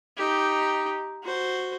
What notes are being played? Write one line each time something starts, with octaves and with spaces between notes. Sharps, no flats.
D#4 G4
F#4 C5